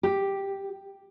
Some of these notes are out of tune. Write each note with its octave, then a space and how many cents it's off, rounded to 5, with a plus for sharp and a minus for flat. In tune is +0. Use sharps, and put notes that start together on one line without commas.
G4 +0